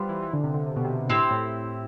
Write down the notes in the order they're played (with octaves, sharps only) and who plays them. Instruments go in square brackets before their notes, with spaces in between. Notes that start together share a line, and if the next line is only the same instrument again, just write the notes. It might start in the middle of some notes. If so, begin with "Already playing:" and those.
Already playing: [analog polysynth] G3 [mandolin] B3 F4 C5
[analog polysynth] E3
E3
D3
C3
D3
C3
B2
C3
[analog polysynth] A2 [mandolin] C4 E4 G4
[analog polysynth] A2